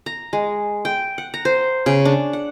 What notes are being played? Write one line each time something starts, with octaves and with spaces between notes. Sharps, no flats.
A#5
G#3
G5
F#5
A#5
C5
C#3
D4
F#5